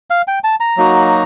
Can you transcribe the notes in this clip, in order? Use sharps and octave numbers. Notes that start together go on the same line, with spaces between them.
F5
G5
A5
A#5
F#3 A#3 D#4 F#4